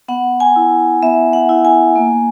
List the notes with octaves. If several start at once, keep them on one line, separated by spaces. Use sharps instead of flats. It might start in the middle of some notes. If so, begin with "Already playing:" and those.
B3 F#5
G#5
E4
B3 E5
F#5
E4
G#5
A#3